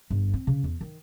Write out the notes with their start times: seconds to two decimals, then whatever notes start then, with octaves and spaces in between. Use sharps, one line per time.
0.10 G1
0.34 C4
0.47 C#3
0.64 E2
0.81 D#3